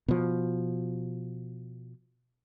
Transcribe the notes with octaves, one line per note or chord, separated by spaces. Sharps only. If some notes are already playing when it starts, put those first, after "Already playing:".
B2 F3